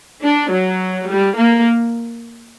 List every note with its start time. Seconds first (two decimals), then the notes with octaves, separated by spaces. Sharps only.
0.22 D4
0.50 F#3
1.06 G3
1.35 A#3